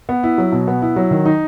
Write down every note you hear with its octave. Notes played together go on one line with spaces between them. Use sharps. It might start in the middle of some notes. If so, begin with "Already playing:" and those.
B3
E4
F#3
B2
B3
E4
F#3
D#3
D#4